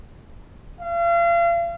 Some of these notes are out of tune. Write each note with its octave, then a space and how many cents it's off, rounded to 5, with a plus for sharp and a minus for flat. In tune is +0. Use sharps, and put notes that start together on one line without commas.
F5 -40